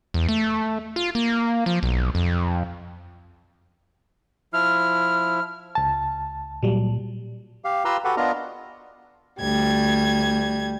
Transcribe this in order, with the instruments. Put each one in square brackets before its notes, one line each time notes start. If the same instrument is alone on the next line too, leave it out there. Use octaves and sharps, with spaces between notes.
[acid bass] E2
A3
F4
A#3
F3
B1
F2
[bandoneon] F3 E4 [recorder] F6
[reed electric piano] C#2 A5
[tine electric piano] A#2 [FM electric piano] F#3 G3
[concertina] G4 F5
F4 G4 B4 A#5 C6 E6
F#4 G4 A4 B4 F#5
B3 D4 F4 A#4 D#5 A#5
[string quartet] D2 G3 G#6